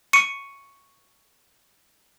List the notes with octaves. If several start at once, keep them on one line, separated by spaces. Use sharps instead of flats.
C#6 C#7 D#7